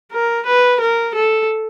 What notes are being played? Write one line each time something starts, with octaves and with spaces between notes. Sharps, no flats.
A#4
B4
A#4
A4